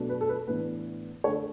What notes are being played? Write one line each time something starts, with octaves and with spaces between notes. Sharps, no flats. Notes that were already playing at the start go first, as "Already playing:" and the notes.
Already playing: B2 F#3 A3 D4
B4
A4
B4
A2 E3 B3 D4 B4
D3 A3 D4 C#5